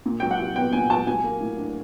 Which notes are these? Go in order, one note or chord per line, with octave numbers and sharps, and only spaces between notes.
A#2
F#3 G5
F#5
C2
B3 G5
A#2 G#5
F#3 A5
F#3 G#5
A#3
A2
D4